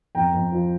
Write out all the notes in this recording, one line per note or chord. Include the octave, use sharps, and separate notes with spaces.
F2 G5 A#5
F2
F3